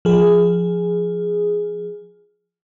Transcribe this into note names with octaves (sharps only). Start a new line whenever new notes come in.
F3 G#4